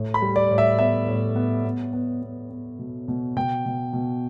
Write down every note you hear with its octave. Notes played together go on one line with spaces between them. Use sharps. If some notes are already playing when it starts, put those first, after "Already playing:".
Already playing: A2
B5
G3
D5
A2
E5
B3 E5
A2
B3
B3
B3
B3
B3
B2
B2
B2 G5
B2
B2